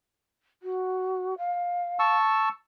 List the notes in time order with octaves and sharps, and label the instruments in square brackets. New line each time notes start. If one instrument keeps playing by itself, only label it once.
[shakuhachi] F#4
F5
[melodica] A5 C#6 E6